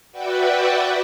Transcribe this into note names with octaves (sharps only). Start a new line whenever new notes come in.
F#4 B4 D5 E5 F#5 G5